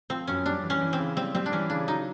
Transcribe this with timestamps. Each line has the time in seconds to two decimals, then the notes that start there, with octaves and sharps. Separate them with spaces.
0.10 F3 C4
0.27 F#2 C#4
0.46 G3 D4
0.63 E3
0.70 C#4
0.81 E3
0.93 C4
0.99 C#3
1.16 G3 C4
1.35 G3 C4
1.46 D4
1.52 E3 C#4
1.70 C#3 D4
1.88 F#3 D#4